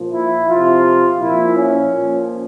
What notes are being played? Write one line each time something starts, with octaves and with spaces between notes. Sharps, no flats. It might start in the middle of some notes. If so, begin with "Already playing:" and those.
Already playing: A#2 F3
E4
C3 F3 F4
A#2 F3 E4
C#4
A#2 F3